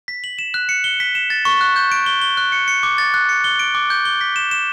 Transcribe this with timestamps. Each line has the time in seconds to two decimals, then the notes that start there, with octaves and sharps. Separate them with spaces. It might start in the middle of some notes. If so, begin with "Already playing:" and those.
0.08 B6
0.24 F#7
0.39 E7
0.54 F#6
0.69 C#7
0.84 G7
1.00 B6
1.15 E7
1.30 A6
1.45 C#6
1.61 F#6
1.76 G6
1.92 D7
2.06 G7
2.21 G7
2.37 F#6
2.52 C#7
2.68 C#7
2.83 D6
2.98 A6
3.14 F#6
3.29 C#7
3.44 G7
3.59 D7
3.75 D6
3.90 G6
4.05 G7
4.21 B6
4.36 E7
4.51 E7